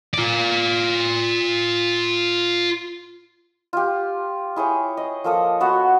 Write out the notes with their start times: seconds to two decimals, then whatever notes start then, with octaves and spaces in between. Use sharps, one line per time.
0.14 F4 D5
3.73 F4 G4
4.56 E4 G#4 C#5 G5
4.97 D#5
5.24 F3 A#3 A4 D#6
5.60 B3 F#4 F#5